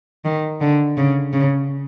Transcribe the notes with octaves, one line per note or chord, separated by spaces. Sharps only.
D#3
D3
C#3
C#3